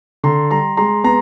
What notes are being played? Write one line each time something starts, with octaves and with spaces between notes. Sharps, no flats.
D3 A#5 C6
G3 A#5 C6
G#3 A#5 C6
B3 A#5 C6